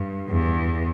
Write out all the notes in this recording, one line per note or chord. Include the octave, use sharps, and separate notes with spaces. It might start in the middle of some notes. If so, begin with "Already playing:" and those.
Already playing: G2
E2